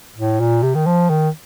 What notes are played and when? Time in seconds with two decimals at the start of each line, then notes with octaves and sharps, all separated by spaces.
0.16 A2
0.40 A#2
0.63 C3
0.75 D#3
0.86 F3
1.10 D#3